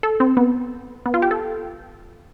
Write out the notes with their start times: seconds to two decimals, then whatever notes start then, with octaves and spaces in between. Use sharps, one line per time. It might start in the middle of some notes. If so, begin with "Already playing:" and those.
0.03 A4
0.20 C4
0.37 B3
1.06 B3
1.14 F4
1.22 G4
1.31 A4